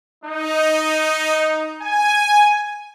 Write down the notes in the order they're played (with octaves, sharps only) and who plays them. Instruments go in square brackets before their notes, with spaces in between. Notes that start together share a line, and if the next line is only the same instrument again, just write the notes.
[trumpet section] D#4
G#5